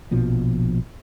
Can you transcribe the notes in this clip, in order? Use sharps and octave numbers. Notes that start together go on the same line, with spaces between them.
A#1 B2 F3 A#3